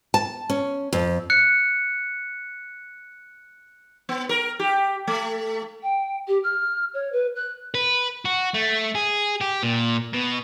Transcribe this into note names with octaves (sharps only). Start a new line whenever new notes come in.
A5
C#4
F2
F#6 C#7
B3
A#4
G4
A3
G5
G4
F6
C#5
B4
F#6
B4
F#4
A3
G#4
G4
A#2
B2